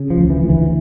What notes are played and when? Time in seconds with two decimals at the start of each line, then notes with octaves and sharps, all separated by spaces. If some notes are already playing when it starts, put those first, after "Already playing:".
Already playing: C#3
0.10 F3
0.17 D2
0.30 E3
0.43 D2
0.49 E3